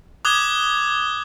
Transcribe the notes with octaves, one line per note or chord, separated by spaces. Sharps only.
D6 D#6 F#6 G#6 G7